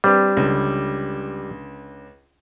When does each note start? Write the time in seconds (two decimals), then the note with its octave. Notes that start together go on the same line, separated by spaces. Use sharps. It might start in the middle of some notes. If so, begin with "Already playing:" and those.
0.04 G3 C4 D4 B4
0.37 C#2 D3